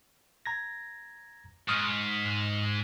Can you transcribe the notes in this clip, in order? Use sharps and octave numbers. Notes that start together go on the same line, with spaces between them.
A#5 G#6 A#6
G#2 C#6 D#6 F6